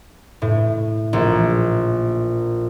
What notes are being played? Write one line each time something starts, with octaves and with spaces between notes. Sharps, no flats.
A2
A#1